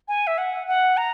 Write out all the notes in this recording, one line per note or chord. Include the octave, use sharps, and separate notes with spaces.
G#5
E5
F#5
F#5
A#5